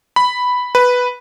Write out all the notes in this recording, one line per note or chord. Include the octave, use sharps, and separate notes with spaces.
B5
B4